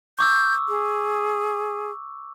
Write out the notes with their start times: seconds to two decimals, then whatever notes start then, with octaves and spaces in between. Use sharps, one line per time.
0.19 C#6 D6 E6 G6
0.69 G#4